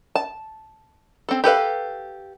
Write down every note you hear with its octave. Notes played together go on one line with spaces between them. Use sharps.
A5
C4 A4
G4 A4 B4 F5